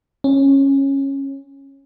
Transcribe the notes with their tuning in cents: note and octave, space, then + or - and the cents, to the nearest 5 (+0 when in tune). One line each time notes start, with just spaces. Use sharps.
C#4 -15